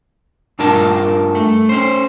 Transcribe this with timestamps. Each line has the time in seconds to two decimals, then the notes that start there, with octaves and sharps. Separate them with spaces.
0.59 G2 D4 F4 A#4 A5
1.35 A3
1.69 C#4 C5